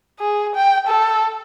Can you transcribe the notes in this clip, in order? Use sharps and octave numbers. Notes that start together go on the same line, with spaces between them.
G#4
G5
A4